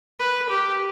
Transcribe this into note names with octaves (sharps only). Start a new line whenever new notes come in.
B4
G4